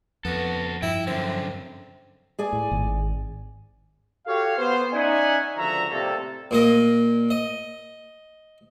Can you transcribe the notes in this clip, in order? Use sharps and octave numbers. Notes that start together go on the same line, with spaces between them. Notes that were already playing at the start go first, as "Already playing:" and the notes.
F2 B3 F#4 A4
G2 F3 E4 G5
F#2 D3 C4
G#4 D5 G#5
A2
G#1
F#4 G4 A4 C#5 F5
B3 C5
C#4 D#4 D5 E5 F#5 G#5
C#2 D3 F3 F#4 E5 A#5
A2 C3 G3 A#3 A4
A#2 A#3 D#5
D#5